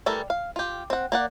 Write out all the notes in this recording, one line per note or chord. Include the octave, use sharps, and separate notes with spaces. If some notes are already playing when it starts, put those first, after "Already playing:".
E3 G3 A3 A4 A#4
F5
F4 G4
C4 F#5
A#3 D5 F#5